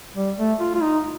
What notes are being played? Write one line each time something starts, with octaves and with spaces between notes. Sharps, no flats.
G3
A3
F4
F4
D#4